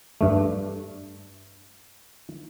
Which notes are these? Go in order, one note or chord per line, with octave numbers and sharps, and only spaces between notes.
G2 A3